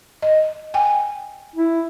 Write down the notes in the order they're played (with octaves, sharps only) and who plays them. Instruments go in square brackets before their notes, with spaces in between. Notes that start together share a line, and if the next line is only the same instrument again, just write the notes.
[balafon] D#5
G5 G#5
[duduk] E4